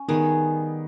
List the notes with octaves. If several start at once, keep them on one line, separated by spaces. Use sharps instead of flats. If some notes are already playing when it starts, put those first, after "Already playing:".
Already playing: C#4
D#3 G3 B3 D#4 G#4